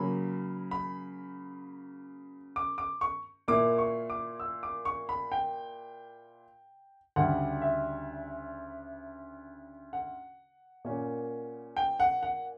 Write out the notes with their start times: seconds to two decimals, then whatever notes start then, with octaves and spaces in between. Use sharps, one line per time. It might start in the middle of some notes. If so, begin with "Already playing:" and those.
Already playing: C#3 F#3 A#3 B5
0.71 B5
2.56 D6
2.78 D6
3.01 C#6
3.48 A#2 A#3 E4 D6
3.78 C#6
4.10 D6
4.40 E6
4.63 D6
4.85 C#6
5.09 B5
5.32 G5
7.16 D2 C#3 G3 F#5
7.62 E5
9.93 F#5
10.85 A#2 A#3 C#4
11.76 G5
12.00 F#5
12.23 F#5